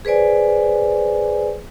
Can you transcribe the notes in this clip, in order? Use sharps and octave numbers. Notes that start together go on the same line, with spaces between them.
G#4 B4 C5 D5 G#5